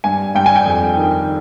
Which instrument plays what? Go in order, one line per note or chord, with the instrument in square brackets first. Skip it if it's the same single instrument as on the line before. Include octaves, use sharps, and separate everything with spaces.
[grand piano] G2 G#5
G2 G5
G#5
G5
F2
D#3